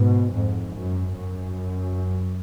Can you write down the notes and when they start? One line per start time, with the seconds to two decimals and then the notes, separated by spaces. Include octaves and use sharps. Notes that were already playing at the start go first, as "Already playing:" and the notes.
Already playing: G#2 B2
0.34 F2 G#2
0.74 F#2
1.15 F#2